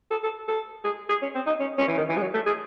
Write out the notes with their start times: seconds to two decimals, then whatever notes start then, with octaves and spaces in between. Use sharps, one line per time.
0.10 A4
0.23 A4
0.48 A4
0.84 G#4
1.09 G#4
1.22 C#4
1.35 C4
1.46 D#4
1.60 C#4
1.78 C#4
1.88 E3
1.97 D#3
2.09 E3
2.17 G#3
2.21 F#3
2.34 A3
2.46 G#4